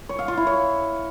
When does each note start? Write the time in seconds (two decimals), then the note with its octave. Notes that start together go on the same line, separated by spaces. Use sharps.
0.09 C#5
0.19 F5
0.28 F4
0.37 E4
0.47 C#5